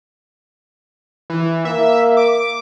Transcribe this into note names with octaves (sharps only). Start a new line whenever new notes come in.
E3
A#3 E5
D6